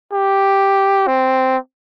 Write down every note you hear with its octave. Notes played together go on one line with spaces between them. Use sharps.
G4
C4